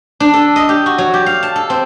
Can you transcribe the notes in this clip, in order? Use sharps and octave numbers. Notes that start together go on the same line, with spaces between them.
D4
A4
D#5
G4
F#4
F#3
G4
F5
A5
A4
C4